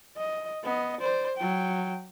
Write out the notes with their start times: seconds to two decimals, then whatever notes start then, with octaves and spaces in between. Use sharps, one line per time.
0.17 D#5
0.63 B3 D#5
1.01 C5 D5
1.37 F#3 G5